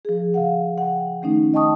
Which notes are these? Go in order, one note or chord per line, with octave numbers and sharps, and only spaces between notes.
F3 G#4
C#3 F5 F#5
F#5 G5
D#3 A3 C#4 D#4
D#5 G5 A5 C#6 D#6